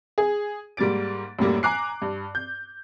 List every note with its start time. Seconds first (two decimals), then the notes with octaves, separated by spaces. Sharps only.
0.18 G#4
0.77 G#2 G3 A#3 A6 D7
1.39 F#2 A2 G3 A#3
1.63 G#5 A#5 D6 F#6 C7
2.02 G2
2.35 G6